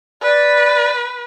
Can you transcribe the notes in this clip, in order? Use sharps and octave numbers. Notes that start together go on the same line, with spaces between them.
B4 D5